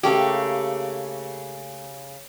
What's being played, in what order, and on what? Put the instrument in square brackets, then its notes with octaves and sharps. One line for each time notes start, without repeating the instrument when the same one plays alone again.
[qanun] C#3 A3 A#3 [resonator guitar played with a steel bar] G4